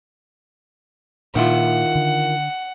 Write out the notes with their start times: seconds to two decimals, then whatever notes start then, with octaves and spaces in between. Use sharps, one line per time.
1.35 A#2 D#3 E4 F4 F#5
1.95 D3